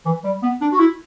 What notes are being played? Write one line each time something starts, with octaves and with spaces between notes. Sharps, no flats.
E3
G3
B3
D4
F#4
E4